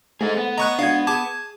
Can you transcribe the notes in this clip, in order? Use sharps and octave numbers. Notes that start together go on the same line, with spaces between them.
G#2 A3 D#4 G#4
B3
C#5 D#5 A#5 C#6 F#6
G#2 D4 F#4 F5 D#6 G#6
G#4 A5 D6 G#6